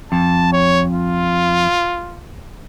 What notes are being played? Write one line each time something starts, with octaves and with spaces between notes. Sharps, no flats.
F2 A5
C#5
F4